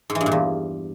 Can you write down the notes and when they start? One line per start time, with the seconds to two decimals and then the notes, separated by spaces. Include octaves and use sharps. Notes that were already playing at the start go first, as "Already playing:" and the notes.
0.10 G#2
0.15 E3
0.21 G2
0.26 A#2
0.32 E2